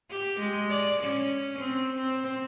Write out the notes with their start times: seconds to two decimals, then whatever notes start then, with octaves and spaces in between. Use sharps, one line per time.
0.10 G4
0.40 G#3
0.70 D5
1.03 C#4
1.60 C4
1.97 C4